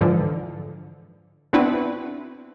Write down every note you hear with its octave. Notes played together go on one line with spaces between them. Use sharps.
G#2 D3 E3 F3
B3 C4 D4 E4 F#4 B4